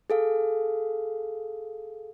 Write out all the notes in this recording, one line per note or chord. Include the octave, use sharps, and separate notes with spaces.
G#4 A4 F5